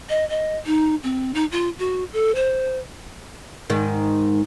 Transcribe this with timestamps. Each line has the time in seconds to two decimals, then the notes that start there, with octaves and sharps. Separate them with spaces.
0.09 D#5
0.29 D#5
0.66 D#4
1.03 C4
1.34 D#4
1.52 F4
1.79 F#4
2.13 A4
2.35 C5
3.70 G#2 D#3